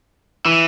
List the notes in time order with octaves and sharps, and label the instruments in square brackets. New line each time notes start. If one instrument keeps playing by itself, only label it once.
[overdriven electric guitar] E3